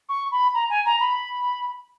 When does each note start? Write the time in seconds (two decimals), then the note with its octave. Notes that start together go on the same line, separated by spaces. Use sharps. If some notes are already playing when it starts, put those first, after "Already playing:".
0.09 C#6
0.32 B5
0.54 A#5
0.70 G#5
0.85 A#5
1.00 B5